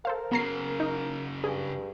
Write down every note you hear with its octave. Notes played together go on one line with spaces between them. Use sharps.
A4 A#4 C5 F5
C#3 F#3 B3 A#5 C7
D#4
G2 G#4